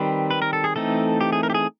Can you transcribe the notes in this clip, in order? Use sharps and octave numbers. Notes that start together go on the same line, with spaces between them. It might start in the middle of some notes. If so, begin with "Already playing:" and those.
Already playing: D#3 G3 C4 B4
B4
A#4
A4
G#4
E3 A3 C4 D#4 A4
G4
G#4
A#4
G4
G#4